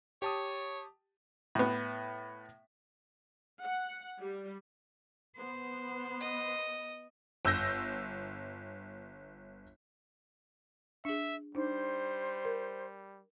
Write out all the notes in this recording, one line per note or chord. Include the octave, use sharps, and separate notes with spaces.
G4 C#5 A5 D#6
A2 B3
F#5
G3
B3 C5
D#5
G1 E6 G6 A#6
D4 G#4 E5
G3 D4 D#4 C5
A#4